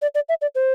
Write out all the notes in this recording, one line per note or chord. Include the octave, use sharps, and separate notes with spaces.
D5
D5
E5
D5
C5